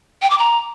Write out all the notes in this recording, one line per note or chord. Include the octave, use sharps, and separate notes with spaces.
G5
D6
A#5